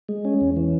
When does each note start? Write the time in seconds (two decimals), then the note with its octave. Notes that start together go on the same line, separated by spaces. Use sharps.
0.09 G#3
0.25 C#4
0.41 E2
0.56 E3